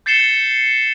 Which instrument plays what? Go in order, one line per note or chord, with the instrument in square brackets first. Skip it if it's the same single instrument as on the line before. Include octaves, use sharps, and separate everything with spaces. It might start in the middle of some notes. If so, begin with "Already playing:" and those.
[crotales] G6 A6 C7 C#7 E7 G7